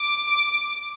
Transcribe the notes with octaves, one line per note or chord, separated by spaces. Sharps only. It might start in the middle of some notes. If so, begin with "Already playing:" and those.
Already playing: D6